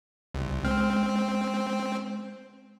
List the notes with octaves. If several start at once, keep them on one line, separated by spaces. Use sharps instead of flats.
C2
G#3 C4 F6